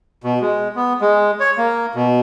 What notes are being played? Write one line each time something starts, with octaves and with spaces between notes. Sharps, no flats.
B2
G#3
B3
G#3
C#5
A#3
B2